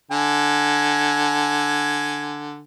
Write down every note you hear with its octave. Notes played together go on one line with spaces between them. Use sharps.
D3 G#5